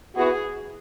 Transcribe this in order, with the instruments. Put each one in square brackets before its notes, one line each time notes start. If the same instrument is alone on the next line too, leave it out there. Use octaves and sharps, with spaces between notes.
[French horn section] E3 B3 F#4 [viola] G#4